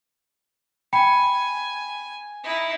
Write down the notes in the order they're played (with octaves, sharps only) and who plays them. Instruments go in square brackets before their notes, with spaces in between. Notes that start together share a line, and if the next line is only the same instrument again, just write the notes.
[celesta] G5 B5 C#7 [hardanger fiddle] G#5
[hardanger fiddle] D#4 E4